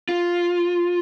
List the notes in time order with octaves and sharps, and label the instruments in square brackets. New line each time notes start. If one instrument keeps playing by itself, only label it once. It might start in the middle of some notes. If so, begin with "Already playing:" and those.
[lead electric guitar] F4